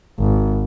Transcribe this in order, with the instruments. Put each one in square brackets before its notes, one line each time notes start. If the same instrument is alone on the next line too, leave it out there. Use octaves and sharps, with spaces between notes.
[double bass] G#1